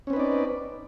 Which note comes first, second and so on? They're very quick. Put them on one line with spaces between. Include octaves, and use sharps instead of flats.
C#4 C4 B4 D#4 D5